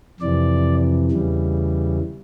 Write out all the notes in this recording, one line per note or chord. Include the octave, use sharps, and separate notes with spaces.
F2 C3 E3 D5
E2 C#3 E3 G3